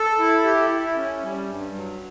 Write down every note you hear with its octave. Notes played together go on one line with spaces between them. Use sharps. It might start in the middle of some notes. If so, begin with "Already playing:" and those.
Already playing: A4
E4
G4
E4
C#4
G3
G2
F#3